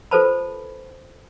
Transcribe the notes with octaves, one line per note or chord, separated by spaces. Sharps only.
F4 A4 B4 C5 A5 B5